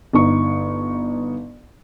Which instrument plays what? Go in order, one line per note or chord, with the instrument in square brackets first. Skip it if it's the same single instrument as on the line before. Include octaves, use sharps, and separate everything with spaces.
[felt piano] G1 D#4 C#6